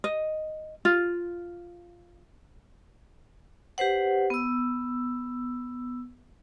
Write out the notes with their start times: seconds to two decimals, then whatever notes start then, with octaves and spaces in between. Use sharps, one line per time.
0.04 D#5
0.85 F4
3.78 G4 B4 C5 F#5
4.30 B3 E6